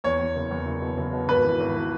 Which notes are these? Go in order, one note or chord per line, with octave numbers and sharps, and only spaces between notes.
E2 C#5
E2
F#1
E2
F#1
B2
F#1
B2
G#1 B4
E3
G#1
E3